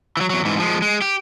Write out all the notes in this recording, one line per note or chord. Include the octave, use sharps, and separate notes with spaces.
E3 F#3
E2 F#3
G#2 E3
F3 G#3
G#3
G4